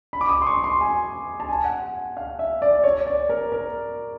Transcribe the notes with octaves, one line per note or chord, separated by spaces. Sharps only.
B5
D6
D#6
C6
C#6
C6
G#5
A5
G#5
F#5
F5
E5
D5
C#5
D5
A#4
A#4